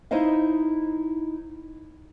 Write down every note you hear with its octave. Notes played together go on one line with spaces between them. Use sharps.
D#4 E4 C5 D#5 F5